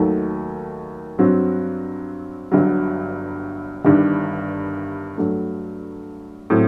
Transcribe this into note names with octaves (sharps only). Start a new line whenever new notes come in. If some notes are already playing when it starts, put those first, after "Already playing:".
Already playing: D#2 D#3 F#3 A3
G2 F#3 C4 F#4
G1 G2 F#3
G1 G2 D#3 G3
G2 F#3 A3
A2 F#3 C4